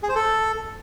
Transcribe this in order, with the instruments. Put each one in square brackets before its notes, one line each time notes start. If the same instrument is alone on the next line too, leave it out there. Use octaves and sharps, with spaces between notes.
[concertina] G#4
C5
A4